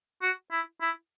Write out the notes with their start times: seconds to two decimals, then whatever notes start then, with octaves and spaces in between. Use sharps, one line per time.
0.22 F#4
0.52 E4
0.81 E4